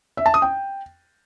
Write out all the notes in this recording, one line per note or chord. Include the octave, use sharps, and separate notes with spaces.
E5
A5
D#6
G5